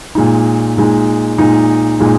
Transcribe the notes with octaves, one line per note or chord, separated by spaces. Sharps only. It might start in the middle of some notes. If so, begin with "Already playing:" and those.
A#2 G#3 D#4
A#2 G#3 D#4
A#2 G#3 D#4
A#2 G#3 D#4